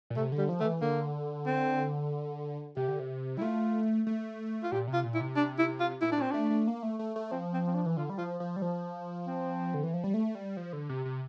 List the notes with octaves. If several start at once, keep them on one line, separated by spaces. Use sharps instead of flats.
A#2
C3 A3
D3
G3
F3
D3 A3
E3
D3 A#3
C4
C3 G4
D3
C3
G3 E4
A3 F4
A3
F4
A#2 G4
C3
F4
A#2
E4
C3
D4
E4
F4
A#2 E4
D4
A#2 C4
A3 D4
A3
A#3
A3
A3
A3
F3 C4
C4
C4
D4
E3
D3 F4
G3
F3 F4
F3
G3
F3
C4
D3
E3
F3
G3
A3
G3
F3
D3
C3
C3